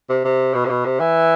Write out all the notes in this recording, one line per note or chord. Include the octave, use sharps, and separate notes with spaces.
C3
C3
B2
C3
B2
C3
E3